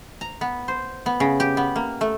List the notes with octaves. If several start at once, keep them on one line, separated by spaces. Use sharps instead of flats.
A#5
B3
C5
B3
C#3
G4
B3
A#3
A3